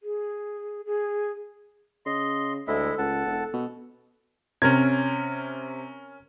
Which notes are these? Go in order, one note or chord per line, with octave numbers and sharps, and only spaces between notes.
G#4
G#4
C#3 D#5 C6
D2 G#3 E4 A4 E5
C#2 F#5 A5
E1
B2
C3 C#4 A#4 G#6